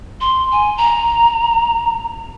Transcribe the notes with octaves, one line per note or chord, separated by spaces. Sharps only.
C6
G#5
A#5